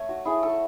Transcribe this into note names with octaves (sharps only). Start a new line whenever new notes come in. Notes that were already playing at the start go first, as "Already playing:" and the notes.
Already playing: A3 C#5
F#4
A3 E4 G#4
A4